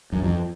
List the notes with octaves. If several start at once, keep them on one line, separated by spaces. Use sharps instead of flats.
F#2
F2